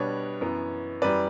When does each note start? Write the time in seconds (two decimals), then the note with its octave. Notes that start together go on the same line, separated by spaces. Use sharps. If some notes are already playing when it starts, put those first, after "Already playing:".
Already playing: B2 G3 B3 D4 C#5
0.41 F#2 E3 B3
1.02 F#2 E3 G3 B4 D5